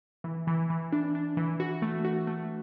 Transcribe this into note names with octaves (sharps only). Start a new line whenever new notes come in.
E3
E3
E3
D4
D4
E3
F#4
A3
F#4
A3